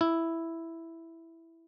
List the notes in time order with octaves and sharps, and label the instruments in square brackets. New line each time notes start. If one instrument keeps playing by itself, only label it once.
[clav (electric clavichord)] E4